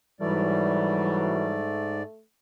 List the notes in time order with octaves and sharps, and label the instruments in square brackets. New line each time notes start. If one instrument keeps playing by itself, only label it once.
[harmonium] G#2 D5 [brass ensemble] E3 F#3 [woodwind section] G3 [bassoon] A3